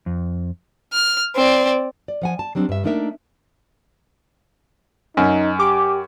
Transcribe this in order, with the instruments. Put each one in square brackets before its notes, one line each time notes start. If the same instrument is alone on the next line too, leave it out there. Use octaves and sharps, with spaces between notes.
[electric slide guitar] F2
[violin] F6
C4 D5
[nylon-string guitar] D5
F3 F#5 G#5
A5
F#3 G3 C4 D4
G2 E5
A3 A#3 D4 D#4 A#4 E5
[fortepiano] F#2 [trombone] D#4
[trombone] G4 [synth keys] D6